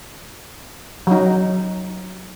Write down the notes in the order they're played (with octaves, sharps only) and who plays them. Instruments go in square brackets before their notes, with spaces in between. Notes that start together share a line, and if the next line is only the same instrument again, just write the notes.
[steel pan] F#3 D#4